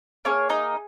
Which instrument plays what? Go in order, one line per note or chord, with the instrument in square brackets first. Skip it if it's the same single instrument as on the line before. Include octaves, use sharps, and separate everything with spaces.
[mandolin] A#3 C#4 G#4 C#5
D#4 D#5